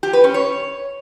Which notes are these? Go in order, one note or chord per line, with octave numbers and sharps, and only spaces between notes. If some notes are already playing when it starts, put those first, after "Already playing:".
G4
B4
C#4
C#5